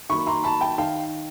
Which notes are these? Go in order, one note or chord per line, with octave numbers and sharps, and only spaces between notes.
D#3 F#3 A#3 B5 C#6
A#5 C6
A5 B5
G5 A5
D#3 F5 G5